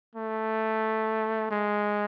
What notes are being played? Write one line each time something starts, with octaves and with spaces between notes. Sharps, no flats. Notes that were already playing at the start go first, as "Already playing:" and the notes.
A3
G#3